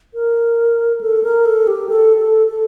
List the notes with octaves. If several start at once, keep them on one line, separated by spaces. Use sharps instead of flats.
A#4
A4
A#4
A4
G4
A4
A4
A4